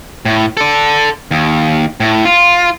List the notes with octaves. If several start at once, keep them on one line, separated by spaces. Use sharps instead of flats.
A2
A4 D5
D#2
A2
F4